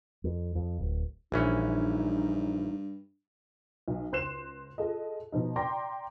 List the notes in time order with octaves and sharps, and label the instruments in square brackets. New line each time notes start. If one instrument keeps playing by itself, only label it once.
[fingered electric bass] F2
F2
D1
[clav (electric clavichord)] A#1 E3 C#4 [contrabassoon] G2 [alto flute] D#4
[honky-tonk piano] B1
C#2 C5 C6 F#6 C7 E7
F4 G#4 A4 D#5
B2 F3 D#4
D5 G5 A#5 C6 D6 A#6